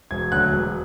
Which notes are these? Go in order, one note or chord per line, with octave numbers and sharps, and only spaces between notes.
E1 G#6
D2 D3 F#3 F#6
E1